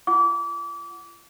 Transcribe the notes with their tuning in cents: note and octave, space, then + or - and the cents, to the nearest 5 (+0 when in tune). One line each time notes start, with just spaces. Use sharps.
F4 -40 F#5 +0 D6 -30